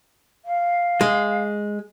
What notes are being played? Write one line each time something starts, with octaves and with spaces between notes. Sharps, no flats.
F5
G#3